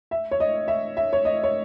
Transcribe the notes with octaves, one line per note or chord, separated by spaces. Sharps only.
E5
C#5
D#5
E5
E5
C#5
D#5
C#5